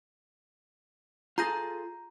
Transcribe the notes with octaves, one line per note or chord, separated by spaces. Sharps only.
F4 G#4 A4 A#5 G6 A#6